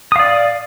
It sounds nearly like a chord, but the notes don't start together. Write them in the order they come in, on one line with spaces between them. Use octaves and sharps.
D#6 F5 D5